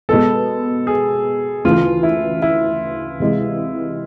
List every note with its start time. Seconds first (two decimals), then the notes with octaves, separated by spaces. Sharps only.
0.09 B2 G#3 B3 A4
0.87 G#4
1.64 D2 C#3 E3 A3 F4
2.03 E4
2.42 E4
3.20 C3 E3 G#3